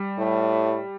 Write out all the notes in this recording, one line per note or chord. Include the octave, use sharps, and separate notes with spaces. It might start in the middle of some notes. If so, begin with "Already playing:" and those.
Already playing: G3
A2